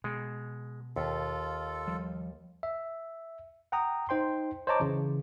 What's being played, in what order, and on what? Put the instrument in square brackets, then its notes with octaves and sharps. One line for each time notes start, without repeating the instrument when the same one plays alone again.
[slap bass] B2 [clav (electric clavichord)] G#3
[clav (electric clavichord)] D#2 [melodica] F4 A4
[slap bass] F3 G3
[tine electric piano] E5
F#5 G5 A#5 D#6
D#4 C5 G5 C6
C5 C#5 D#5 A5 A#5 D6
C#3 E3